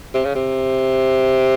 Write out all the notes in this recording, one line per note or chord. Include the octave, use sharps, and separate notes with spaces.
C3
C#3
C3